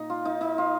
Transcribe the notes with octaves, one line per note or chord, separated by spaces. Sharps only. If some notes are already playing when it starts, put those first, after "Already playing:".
Already playing: A#2 D#4
F4
D#4
D#4
F4